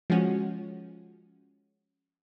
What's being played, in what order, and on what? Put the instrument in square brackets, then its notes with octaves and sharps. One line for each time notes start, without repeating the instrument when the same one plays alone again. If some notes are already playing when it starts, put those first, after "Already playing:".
[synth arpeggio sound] F3 G#3 C#4 F#4